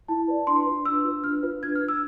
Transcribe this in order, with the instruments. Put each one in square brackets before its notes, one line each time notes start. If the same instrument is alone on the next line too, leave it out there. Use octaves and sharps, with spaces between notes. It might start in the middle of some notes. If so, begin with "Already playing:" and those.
[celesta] E4 A5
B4 D5
D4 C6
F4 B4
D4 E6
F4 B4
D4 F6
F4 B4
D4 G#6
F6
F4 B4
E6